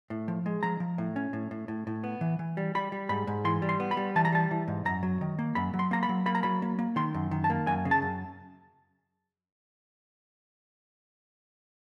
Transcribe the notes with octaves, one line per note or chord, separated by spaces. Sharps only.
A2
F3
G#3
F3 A#5
F3
A2
C#4
A2
A2
A2
A2
B3
E3
E3
G3
G3 B5
G3
G#2 B5
G#2
E3 C6
G3
C6
B3
B5
G3
E3 A5
A#5
G3 A5
E3
G#2
F#2 A#5
F#3
D#3
A#3
F#2 B5
F#3
C6
A#3 A#5
B5
F#3
A#3 B5
A#5
F#3 B5
A#3
A#3
D#3 C6
F#2
D#3
A5
A#3
F#2 G#5
C#3
A5
F#2